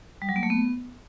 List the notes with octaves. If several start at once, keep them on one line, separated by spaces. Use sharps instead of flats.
G3
F#3
A#3
A3
B3